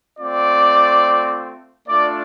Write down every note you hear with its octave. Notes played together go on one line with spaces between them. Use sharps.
A3 C4 F4 D5
A3 D4 F4 D5